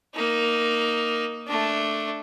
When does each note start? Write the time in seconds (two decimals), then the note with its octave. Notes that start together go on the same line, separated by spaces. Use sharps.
0.15 A#3 D#4
1.47 A3 D4